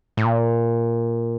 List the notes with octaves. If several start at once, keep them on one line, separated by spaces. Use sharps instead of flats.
A2
A#2